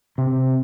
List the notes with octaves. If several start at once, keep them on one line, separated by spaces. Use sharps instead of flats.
C3